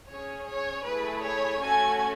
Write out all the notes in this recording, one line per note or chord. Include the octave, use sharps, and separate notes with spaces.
C#4 G#4 C#5
C#5
A3 E4 G#4 B4
C#5
A3 C#4 F#4 A4 G#5